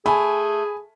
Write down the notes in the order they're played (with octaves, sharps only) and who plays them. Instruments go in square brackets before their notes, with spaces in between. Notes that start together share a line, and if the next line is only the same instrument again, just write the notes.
[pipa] A3 [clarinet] G#4 [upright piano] G#5 B5